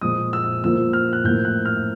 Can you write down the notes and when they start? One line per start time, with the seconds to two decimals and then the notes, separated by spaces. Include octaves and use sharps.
0.01 A#2 F3 G#3 D#6
0.33 E6
0.64 A#2 F3 A#3 E6
0.93 F6
1.13 F#6
1.24 A2 F3 A#3 G6
1.45 F#6
1.65 F6